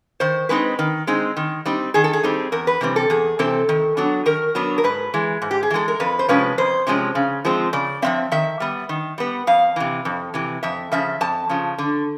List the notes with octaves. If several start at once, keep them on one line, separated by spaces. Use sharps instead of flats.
D#3 C5
G#3 C4 D#4 B4
D#3
G#3 C4 D#4
D#3
G3 C4 D#4
D#3 G#4
A4
G#4
G3 C4 D#4
E2 A#4
B4
C3 E3 G3 C4
A4
E2 G#4
C3 E3 C4 A4
D#3
F#3 B3 D4
D#3 A#4
F#3 B3 D4
A#4
G#2 B4
E3 G#3
G#2
G4
G#4
E3 G#3 A4
A#4
F2 B4
C5
C3 F3 G#3 C#4 B4
F2 C5
C3 F3 G#3 C#4
C#3
F3 G#3 C4
C#3 D5
F3 G#3 C4 E5
D#3 E5
G3 B3
D#3
G3 B3
F2 F5
C3 E3
F2
C3 E3
F2 E5
C#3 F3 E5
F2 A5
C#3 F3
D3